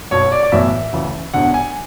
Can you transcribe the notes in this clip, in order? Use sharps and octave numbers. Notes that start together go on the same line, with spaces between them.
B1 B2 C#5
D5
D5
B1 A2 E3 E5
D2 C#3 E3
E1 E2 D3 F#5
G#5